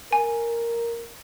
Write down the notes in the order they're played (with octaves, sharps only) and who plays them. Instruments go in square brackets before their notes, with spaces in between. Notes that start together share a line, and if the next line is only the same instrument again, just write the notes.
[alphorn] A#4 [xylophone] G#5